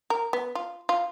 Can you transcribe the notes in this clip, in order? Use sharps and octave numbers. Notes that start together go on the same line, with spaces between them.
A#4
B3
F4
F4